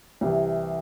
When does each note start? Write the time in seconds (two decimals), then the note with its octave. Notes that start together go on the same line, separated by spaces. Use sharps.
0.21 C2 C3 E3